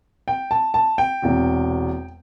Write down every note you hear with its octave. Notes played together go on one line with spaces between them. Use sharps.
G5
A5
A5
G5
E1 E2 C3